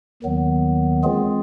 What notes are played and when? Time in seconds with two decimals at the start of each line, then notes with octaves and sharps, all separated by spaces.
0.23 D#2 D#3 F#3 B3
1.03 E3 G#3 C4 F4 G#4